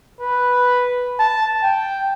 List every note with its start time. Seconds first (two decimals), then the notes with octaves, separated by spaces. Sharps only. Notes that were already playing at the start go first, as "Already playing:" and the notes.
0.21 B4
1.20 A5
1.63 G5